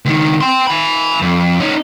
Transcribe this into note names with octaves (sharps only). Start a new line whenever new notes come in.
C#2 D#3
G5 C6
G#5 B5
F2
C#4 D#4